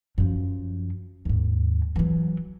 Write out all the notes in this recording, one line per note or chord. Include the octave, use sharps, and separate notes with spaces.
F#2 F3
D#2 G#2
E3 F#3